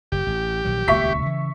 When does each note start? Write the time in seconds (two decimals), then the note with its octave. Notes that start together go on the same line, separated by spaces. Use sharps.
0.12 F#1 G4
0.27 A1
0.65 A#1 D#3 F#3
0.88 D#1 C#2 A#3 E5 C#6 B6
1.22 C#3 E3